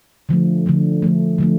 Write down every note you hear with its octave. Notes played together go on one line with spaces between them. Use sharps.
D3 F3 A3
D3 F3 A3
D3 F3 A3
D3 F3 A3